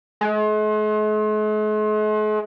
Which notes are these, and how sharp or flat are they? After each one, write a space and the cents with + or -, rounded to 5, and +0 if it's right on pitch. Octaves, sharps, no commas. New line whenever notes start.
G#3 +45